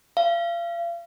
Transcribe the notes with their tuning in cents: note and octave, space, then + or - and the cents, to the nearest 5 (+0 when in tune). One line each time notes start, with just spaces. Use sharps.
F5 -35